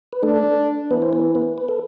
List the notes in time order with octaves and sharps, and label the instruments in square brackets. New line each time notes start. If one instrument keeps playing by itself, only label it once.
[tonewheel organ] B4
[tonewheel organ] A3 A4 [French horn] D4
[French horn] E3 [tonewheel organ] B3 B4
[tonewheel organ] C5
B3 B4
B3 B4
B4
A4